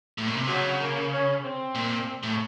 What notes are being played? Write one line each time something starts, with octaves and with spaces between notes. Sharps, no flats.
A2
A#2
C3
C#3 F#3
A#3
C#4
C4
A#2
A2